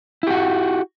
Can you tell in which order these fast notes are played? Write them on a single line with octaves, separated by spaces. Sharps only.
E4 G4 F#4